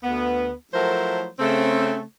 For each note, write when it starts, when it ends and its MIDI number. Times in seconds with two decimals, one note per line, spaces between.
0.03 0.52 38
0.03 0.52 59
0.74 1.27 53
0.74 1.27 54
0.74 1.27 57
0.74 1.27 64
0.74 1.27 70
0.74 1.27 72
1.39 2.01 49
1.39 2.01 57
1.39 2.01 60